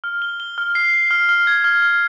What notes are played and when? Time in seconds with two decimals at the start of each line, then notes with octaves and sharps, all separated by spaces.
0.04 F6
0.22 G7
0.40 G7
0.58 F6
0.75 C7
0.94 C7
1.11 F6
1.29 F6
1.47 G#6
1.64 F6
1.82 F6